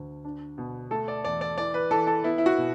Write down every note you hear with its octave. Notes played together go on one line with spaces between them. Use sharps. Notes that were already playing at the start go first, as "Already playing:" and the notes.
Already playing: D2 D3
D4
B2
A3 A4
D5
E2 D5
D5
E3 D5
B4
E3 A4
A4
B3 E4
E4
F#4
B2